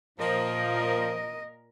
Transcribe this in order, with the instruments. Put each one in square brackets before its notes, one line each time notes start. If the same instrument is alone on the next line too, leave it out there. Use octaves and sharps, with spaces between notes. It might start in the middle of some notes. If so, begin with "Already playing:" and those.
[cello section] A#2 A#4 [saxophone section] F3 [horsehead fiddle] D#5